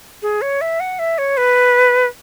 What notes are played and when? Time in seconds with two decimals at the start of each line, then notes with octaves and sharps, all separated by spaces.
0.22 G#4
0.42 C#5
0.61 E5
0.80 F#5
0.99 E5
1.18 C#5
1.37 B4